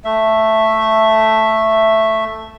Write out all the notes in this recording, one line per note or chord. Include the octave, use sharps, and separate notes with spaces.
A3 E5